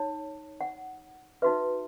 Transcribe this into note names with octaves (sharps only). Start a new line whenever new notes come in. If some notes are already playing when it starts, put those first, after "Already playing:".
Already playing: D#4 C#5
F#5
D#4 F#4 B4 E5